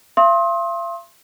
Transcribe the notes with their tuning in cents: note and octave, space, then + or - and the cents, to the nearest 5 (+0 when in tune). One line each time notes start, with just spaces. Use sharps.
F5 -45 C6 +30 D#6 +35